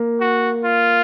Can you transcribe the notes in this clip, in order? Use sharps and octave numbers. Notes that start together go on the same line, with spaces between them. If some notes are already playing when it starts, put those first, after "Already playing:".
Already playing: A#3
F#4
F4